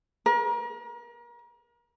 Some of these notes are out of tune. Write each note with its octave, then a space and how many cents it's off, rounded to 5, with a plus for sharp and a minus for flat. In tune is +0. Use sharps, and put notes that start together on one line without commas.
A#4 +35